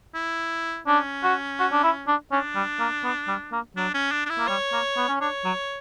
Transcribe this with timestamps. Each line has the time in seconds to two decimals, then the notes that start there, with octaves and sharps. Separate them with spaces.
0.14 E4
0.87 C#4 D4
1.23 F#4
1.59 F#4
1.72 D4
1.83 E4
2.08 D4
2.31 C#4 D4
2.55 G3
2.80 A#3
3.04 B3
3.28 G3
3.52 A#3
3.76 F#3 D4
3.94 C#4
4.12 D4
4.26 D4
4.30 E4
4.38 A#3
4.48 G3 C#5
4.72 A#3
4.97 B3
5.09 C#4
5.21 D4 C#5
5.45 F#3